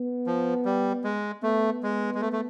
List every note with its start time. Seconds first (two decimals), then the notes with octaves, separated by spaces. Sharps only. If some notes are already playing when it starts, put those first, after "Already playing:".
Already playing: B3
0.27 F3
0.65 G3
1.04 G#3
1.43 A3 B3
1.83 G#3
2.15 G#3
2.21 A3
2.33 A3